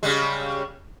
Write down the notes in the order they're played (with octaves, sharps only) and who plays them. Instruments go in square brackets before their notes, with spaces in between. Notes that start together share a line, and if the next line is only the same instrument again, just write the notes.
[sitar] C#3 G3 G#3